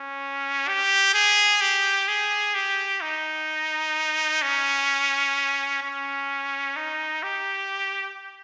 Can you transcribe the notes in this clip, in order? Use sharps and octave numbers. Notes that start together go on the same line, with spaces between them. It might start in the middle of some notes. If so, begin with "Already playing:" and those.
Already playing: C#4
G4
G#4
G4
G#4
G4
D#4
C#4
C#4
D#4
G4